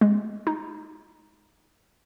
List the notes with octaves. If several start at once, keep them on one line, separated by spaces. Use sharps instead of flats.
G#3
D#4